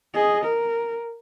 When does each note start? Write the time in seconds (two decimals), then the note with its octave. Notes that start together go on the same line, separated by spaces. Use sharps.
0.14 G#4 D#5
0.44 A#4